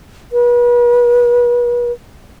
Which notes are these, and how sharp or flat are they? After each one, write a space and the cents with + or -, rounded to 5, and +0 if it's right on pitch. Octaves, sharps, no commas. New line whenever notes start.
B4 -40